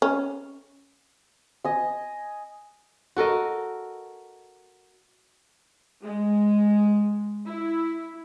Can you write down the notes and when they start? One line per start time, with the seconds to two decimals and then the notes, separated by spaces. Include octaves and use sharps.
0.02 C#4
1.64 D#5 G#5
3.16 F#4 A4 A#4 D#5
6.03 G#3
7.47 E4